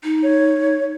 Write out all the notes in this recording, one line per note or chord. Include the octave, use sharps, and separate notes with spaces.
D#4
C#5